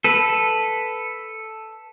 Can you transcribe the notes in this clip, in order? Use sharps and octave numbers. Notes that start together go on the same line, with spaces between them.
A4 B4